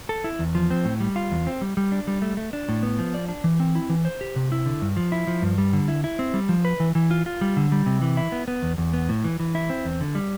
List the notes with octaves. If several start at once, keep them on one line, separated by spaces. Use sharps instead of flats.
A4
E4
E2
F3
C4
A2
G3
F4
E2
C4
G3
G3
D4
G3
A3
A3
D4
A2
B3
F3
D5
D4
E3
C4
E4
E3
C5
G4
C3
E4
D3
G2
F3
E4
F3
G2
G3
D3
E4
E4
C4
G3
F3
B4
E3
E3
F4
F4
G3
D3
G3
C3
E3
E4
B3
B3
E2
E2
B3
A2
E3
E3
E4
C4
E2
D3
G3